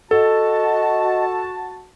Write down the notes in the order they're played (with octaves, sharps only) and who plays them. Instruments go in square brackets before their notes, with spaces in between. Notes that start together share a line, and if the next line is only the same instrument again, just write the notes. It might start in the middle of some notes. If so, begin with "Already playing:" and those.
[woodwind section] F#4 A5 [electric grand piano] A4 [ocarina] D#5